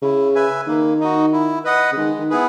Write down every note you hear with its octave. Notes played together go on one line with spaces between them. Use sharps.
C#3 E4
B4 E5 G#5
D#3 A#3
D#4 F#4
E4
B4 D#5 F#5
C#3
D#3 G#3
D#3
B3 E4 G#4 B4